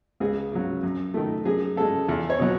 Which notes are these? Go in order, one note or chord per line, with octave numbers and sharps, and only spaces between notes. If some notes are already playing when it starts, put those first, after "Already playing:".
C#2 G#4
C#3 F#3
F#2
D#3 A3
F#2 G#4
C#3 G#3 A4
E2
C#5
B2 F#3